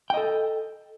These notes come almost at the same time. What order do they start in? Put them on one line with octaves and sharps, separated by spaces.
G5 D#5 A4